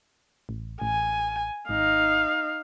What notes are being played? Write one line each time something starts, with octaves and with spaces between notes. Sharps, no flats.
A1
A1 G#5
G#1 D#4 F5